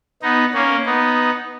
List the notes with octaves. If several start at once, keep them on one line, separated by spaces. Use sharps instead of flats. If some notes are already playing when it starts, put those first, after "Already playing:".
B3 D#4
A#3 C#4
B3 D#4